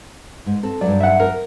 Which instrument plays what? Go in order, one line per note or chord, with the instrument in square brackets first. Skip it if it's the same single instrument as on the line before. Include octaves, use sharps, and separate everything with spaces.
[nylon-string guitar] G#2
C4 A4
[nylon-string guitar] G2 F#3 [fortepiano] D5
[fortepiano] E5 F#5
A#4